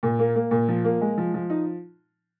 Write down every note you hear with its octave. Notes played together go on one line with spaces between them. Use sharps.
A#2
A#3
A#3
A#2
F3
A#3
G#3
F3
F3
D#4